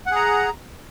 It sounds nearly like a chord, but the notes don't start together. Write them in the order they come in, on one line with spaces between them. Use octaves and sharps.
F#5 G#4 A#5